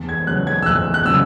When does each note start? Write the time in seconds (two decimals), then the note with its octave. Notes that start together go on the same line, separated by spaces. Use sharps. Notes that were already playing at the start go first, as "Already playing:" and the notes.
Already playing: E2
0.09 G#6
0.27 C#3 F#3 F#6
0.47 G#6
0.62 E6
0.66 E2 F#6
0.94 F#6
1.06 C#3 F#3 E6